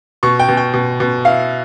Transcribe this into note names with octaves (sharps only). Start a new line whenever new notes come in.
B2 C#6
G5
B2
G5
B2
B2
E4 F5